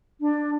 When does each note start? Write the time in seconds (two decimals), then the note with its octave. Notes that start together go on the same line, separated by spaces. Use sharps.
0.21 D4